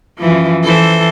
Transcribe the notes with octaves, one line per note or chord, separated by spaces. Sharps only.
F#2 E3 F3
E3 A4 C5